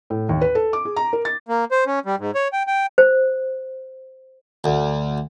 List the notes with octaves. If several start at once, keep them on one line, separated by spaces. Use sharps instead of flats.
A2
D#2
B4
A4
D6
G#4
A#5
A#4
A6
A#3
C5
C#4
G3
G#2
C#5
G5
G5
C5
D2